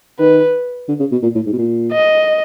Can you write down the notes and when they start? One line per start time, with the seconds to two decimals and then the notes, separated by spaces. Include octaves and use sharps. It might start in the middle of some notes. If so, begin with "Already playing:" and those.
0.19 D#3 B4
0.89 D3
1.00 C#3
1.12 B2
1.23 A#2
1.35 A2
1.46 G#2
1.53 B2
1.58 A#2
1.92 D#5